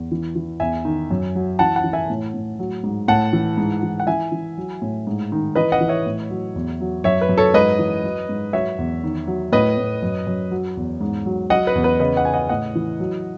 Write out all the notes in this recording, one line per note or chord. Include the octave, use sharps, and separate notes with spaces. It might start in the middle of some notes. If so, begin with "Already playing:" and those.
Already playing: E2
E3
E3
E2 E5 G#5
D#3
F#2
F#3
E3 F#5 A5
F#5 A5
E3
E5 G#5
A2
A2
F#3
G#2
A2 F#5 A5
E3
G#2
E3
F#5
E3 E5 G#5
E3
F#3
A2
G#2
D#3
E3 B4 D#5
D#5 F#5
E3
C#5 E5
A2
F#3
E2
F#3
F#2 C#5 E5
B4
F#2
A4 C#5
G#2 B4 D#5
E3
F#3
G#2
F#3 C#5 E5
E2
D#3
F#3
A2 B4 D#5
A2
F#2
F#2
F#3
E2
G#2
F#3
F#3 D#5 F#5
B4
E2
B4
C#3 B4 D#5
D#5 F#5
C#3 G#5
D#5 F#5
A2 D#5 F#5
E3
F#3